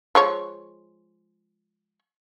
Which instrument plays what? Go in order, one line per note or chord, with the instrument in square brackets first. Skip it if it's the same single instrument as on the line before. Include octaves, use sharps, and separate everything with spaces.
[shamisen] F3 G#3 C#5